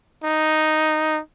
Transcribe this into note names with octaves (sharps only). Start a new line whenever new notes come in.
D#4